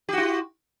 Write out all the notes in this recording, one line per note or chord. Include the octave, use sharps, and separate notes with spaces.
E4 F#4 G4